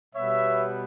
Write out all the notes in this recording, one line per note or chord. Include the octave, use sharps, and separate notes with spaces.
B2 G3 B3 C#5 E5